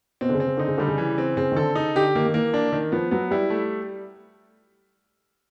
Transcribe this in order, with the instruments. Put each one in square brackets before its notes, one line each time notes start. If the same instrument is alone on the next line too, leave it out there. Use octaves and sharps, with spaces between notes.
[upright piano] B2 [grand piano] C4
[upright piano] D3
C#3
[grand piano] C4
[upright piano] C#3
[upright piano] D3 [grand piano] D#4
[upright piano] C#3
[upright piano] D3 [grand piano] G3
[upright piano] C#3
[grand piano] E3
C4
[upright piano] C#3 [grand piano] C4
[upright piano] D#3
[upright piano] D3 [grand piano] A4
[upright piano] C#3 [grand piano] D#4
[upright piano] D3 [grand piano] G4
[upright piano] D#3 [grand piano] A#3
[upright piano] D#3
[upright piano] E3 [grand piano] A#3
[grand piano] D4
D#3
[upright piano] F3 [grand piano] B3
[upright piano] F#3 [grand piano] B3
[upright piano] G3 [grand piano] E4
[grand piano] A3